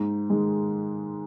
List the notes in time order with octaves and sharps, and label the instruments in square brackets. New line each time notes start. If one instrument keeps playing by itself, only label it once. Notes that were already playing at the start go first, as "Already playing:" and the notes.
Already playing: [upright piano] G#2
D#3 G#3